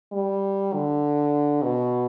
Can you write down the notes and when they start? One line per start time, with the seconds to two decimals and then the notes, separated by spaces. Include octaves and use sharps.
0.13 G3
0.73 D3
1.63 B2